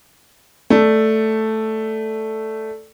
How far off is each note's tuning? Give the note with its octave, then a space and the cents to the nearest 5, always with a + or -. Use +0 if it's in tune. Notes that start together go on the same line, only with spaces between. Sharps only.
A3 +0 D5 +0